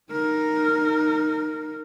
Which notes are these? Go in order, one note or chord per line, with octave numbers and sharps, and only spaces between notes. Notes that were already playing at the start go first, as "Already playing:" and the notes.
D#4 A#4